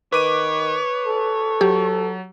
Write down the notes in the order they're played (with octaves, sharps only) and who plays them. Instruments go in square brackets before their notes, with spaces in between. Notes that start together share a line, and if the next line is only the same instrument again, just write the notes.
[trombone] D#3 [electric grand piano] B4 D6 D#7 [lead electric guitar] C#5
[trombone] A4
[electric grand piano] F#3 [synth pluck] G4